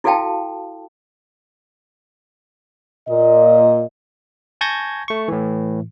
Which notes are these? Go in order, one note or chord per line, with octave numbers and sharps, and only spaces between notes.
E4 F#4 A4 F5 G5 A5
A#2 D#5
G#5 A5 C#6 G6 G#6 A#6
A3 C#6
A2 E3